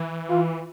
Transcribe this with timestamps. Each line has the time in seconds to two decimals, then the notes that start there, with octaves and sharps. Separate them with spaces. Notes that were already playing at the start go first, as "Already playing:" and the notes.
Already playing: E3
0.30 F4